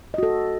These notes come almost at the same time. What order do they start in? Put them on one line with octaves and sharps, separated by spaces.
D#5 F#4 A4